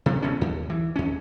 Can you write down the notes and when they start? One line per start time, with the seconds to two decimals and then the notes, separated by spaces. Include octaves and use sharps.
0.06 C3
0.22 D1 A#1 B3 C#4
0.41 D#2
0.70 E3
0.96 D#2 C#4